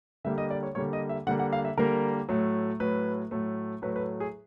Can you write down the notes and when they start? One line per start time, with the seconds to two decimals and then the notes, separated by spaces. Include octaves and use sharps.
0.25 D3 G3 A#3 E5
0.38 D#5
0.50 D5
0.63 C#5
0.75 D3 G3 A#3 C#5
0.93 D#5
1.09 E5
1.27 D3 G3 A#3 F#5
1.39 F#5
1.53 F5
1.65 E5
1.77 D3 G3 A#3 A#4
2.29 A2 F#3 A3
2.80 A2 F#3 A3 B4
3.31 A2 F#3 A3
3.82 A2 F#3 A3 B4
3.96 B4
4.20 G#4